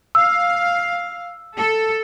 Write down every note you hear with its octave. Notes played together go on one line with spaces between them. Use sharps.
F5 E6
A4